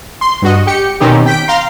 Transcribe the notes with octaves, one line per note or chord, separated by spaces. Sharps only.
C6
G2 F#4 D#5
G4 G5 C#7
B2 D#3 C4 C#4 D#4 G4
G5 B6 D7
F5 A#5 C6